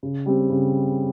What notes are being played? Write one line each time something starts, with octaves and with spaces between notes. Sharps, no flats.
C#3
G3 C4
C#3